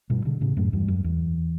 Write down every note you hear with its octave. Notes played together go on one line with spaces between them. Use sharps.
G2 B2
B2 D3
A2 C#3
F#2 A2
E2 G2
F#2
E2